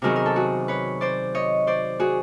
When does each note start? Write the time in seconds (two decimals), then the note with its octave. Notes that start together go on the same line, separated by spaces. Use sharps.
0.02 C3 D#3 F#3 B3 G#4 A#4
0.16 A#4
0.26 A4
0.36 F#4 G#4
0.68 B4 C#5
1.01 C5 D5
1.35 C#5 D#5
1.67 C5 D5
2.00 F#4 G#4